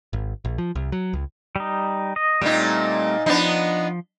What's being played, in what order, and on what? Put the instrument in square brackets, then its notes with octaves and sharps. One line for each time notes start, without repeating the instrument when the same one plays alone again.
[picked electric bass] G#1
A#1
F3
C2
F#3
C#2
[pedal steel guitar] G3 D#4
D#5
[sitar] A#2 D#4 [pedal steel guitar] G3 A3 C4
[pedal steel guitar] F3 [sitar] B3 D4 D#4